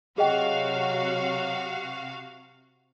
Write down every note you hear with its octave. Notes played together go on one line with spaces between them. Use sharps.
C3 F#3 F#4 G#4 D#5 F5 G5